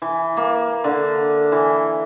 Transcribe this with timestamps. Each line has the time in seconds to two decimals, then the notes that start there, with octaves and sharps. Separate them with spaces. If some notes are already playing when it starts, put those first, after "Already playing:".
0.02 E3
0.37 A#3
0.84 D3
1.52 E3